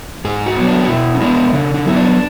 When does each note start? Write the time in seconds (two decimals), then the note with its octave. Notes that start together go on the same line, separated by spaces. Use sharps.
0.25 G#2 G#4
0.46 F#4
0.57 F#3 B3
0.67 D4
0.85 F#4
0.88 B2 E4
1.15 C#4
1.21 G#3 B3 D4
1.53 C#3 D4
1.74 D4
1.85 F#3 B3 E4
1.96 D4